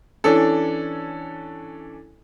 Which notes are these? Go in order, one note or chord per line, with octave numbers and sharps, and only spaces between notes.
E3 C#4 D4 A4